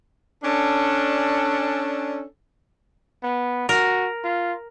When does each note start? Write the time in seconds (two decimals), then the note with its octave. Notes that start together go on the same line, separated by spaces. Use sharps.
0.44 C#4 D4 A4
3.23 B3
3.69 F#4 A#4
4.24 F4